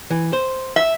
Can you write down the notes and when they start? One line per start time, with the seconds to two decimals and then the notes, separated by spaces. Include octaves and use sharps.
0.10 E3
0.33 C5
0.76 E5